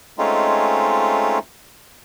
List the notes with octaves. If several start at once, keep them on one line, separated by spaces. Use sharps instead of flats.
G#3 A3 C4 C#4 D#4 F4